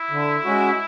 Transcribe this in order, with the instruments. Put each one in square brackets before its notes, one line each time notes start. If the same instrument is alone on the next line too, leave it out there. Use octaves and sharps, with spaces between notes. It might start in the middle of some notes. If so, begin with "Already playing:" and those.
Already playing: [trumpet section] E4
[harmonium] D3
G#3 C#4 F#4